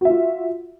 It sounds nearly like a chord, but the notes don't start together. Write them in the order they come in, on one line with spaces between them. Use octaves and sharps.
F#4 E5 F4